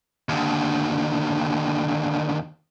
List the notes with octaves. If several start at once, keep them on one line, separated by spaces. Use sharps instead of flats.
D#2 D3